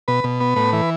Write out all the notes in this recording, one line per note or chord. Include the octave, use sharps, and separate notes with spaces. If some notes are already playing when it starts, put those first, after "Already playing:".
B2 B4
B2
B3
A2 B4
E3